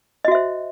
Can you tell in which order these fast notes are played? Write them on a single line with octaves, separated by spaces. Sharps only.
D#5 F#4 E5 C5